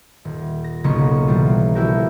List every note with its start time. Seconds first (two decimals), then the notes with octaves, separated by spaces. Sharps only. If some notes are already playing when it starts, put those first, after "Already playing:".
0.25 D#1
0.64 A#6
0.84 B1 C#3 A#3 C#4 C#6
1.27 B2 E3 G3 F4
1.75 F3 A3 E4 F#4 G4 A#4